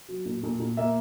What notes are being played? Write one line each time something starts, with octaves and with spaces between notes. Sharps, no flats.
F#3
A#2
A#2
A#2
A#3 E5